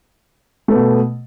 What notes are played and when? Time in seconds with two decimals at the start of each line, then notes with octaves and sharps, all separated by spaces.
0.68 A3
0.71 B3
0.74 B2